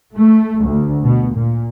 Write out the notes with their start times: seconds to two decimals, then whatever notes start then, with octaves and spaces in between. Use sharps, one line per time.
0.15 A3
0.65 D2
1.04 B2
1.33 A#2